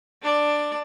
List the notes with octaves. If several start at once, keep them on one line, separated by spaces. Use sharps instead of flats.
D4 D5